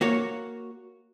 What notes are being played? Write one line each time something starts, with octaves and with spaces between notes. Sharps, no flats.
A#3 F#4 C#5